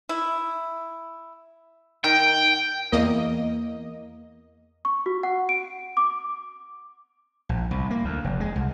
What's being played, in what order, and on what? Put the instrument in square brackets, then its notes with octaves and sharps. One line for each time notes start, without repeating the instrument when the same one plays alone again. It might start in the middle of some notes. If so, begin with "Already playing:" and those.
[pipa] E4
[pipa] D#3 [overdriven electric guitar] G5
[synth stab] E2 A#3 D#5
[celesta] C#6
F#4
F#5
D7
D6
[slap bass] A#1
C2
A#3
D2
F1
G#3
C2